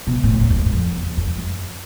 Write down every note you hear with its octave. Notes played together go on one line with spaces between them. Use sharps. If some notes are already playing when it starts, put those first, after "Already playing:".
B2
A2
F2
E2
F#2
F2
F#2
F2
E2
F2
F#2